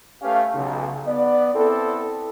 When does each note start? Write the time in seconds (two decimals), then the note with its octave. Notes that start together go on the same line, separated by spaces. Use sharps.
0.22 A3 C#4 G4 B4 F5
0.54 B1 C#3
1.06 B3 D5
1.54 B3 C4 E4 A4